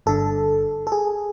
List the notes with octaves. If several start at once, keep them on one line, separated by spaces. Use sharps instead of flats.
G1 G2 D3 A4
A4
G#4